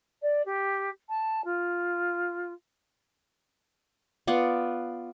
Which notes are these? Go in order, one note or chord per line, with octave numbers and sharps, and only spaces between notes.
D5
G4
A5
F4
B3 F4 D5 F#5